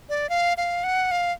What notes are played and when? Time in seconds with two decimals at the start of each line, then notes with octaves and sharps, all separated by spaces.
0.09 D5
0.29 F5
0.57 F5
0.84 F#5
1.11 F5